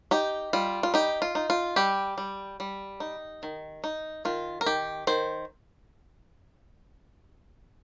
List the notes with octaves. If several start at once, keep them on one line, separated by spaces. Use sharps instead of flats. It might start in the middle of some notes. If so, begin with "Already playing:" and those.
D#4 G4
G3 F4
F4
D#4 G4
F4
D#4
F4
G3 G4
G3
G3
D#4
D#3
D#4
D#3 F4
A#4
D#3 G4
D#3 C5